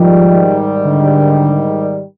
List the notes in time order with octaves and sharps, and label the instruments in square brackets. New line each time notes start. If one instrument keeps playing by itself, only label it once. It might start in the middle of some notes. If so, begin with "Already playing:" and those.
Already playing: [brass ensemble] G#2 D#3 G3 [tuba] F3
[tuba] D3